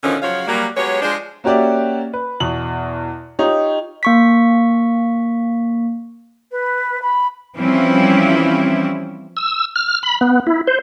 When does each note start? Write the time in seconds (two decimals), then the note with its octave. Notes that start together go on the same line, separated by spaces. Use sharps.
0.02 B2 D3 D#3 F3 C#4
0.22 C#3 F3 F#3 F#4 C#5 F5
0.47 F#3 G3 A#3
0.76 F#3 G#3 B3 G4 C#5
1.02 F3 G#3 D4 C5
1.44 A#3 C#4 F#4 G4 D5 E5
2.13 B4
2.40 E2 B2 F#7
3.39 D#4 F4 G4 C#5
4.03 A#3 C#6 B6
6.51 B4
7.02 B5
7.57 E3 F3 G3 C4 C#4 E4
9.37 E6
9.76 F6
10.03 B5
10.21 B3
10.47 E4
10.67 C5